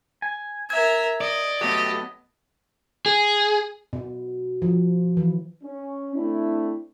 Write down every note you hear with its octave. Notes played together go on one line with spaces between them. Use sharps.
G#5
A#4 E5 G#6
D5 D#5
F#3 A3 B3 G4 D#5
G#4
B2
F3
E3
C#4
A3 C4 D4 E4